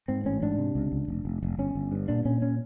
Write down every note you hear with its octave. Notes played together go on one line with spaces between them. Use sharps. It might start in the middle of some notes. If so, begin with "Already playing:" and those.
G#2 C4
A1 C#4
G#2 D4
C3
C#2
C#2
F1
F1
F1
G1 C#4
G1
G2
A#2 D4
A#2 C#4
C#4